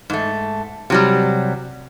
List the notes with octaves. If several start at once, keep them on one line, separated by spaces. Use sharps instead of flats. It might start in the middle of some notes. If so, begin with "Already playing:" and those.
G#2 A3
C3 F#3 G3